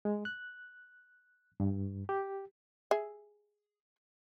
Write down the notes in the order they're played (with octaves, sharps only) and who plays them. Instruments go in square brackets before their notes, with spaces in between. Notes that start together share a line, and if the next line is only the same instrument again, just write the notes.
[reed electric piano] G#3
F#6
G2
G4
[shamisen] G#4 E5